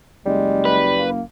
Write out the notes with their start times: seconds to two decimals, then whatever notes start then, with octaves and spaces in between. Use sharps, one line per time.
0.26 F#1 G3 G#3
0.65 B4
0.96 A#3